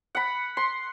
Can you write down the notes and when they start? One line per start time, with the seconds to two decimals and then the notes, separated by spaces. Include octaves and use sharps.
0.15 F#5 B5
0.57 C6